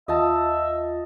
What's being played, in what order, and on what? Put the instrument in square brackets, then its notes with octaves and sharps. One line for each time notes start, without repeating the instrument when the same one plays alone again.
[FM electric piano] D#2 F4 [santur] D#5 A5 [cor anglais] E5